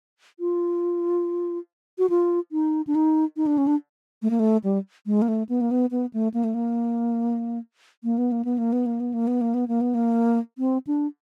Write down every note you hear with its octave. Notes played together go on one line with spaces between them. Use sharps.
F4
F#4
F4
D#4
D4
D#4
D#4
D4
C#4
D4
A3
A#3
A3
G3
G#3
A#3
A3
B3
A#3
B3
B3
A3
A#3
A3
A#3
A#3
B3
A#3
B3
A#3
B3
A#3
B3
A#3
B3
A#3
B3
A#3
B3
A#3
C4
D4